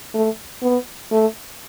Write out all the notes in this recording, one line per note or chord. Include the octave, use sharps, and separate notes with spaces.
A3
B3
A3